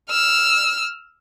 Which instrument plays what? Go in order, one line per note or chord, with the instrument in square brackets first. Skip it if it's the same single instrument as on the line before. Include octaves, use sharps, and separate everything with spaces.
[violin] E6 F6